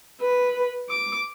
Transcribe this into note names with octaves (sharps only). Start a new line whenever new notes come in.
B4
D6